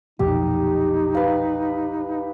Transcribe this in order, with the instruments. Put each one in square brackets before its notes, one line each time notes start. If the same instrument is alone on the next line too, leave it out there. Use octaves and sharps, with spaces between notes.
[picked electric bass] B1 F2 A#2 [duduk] D#4 [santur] G4
[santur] B4 F5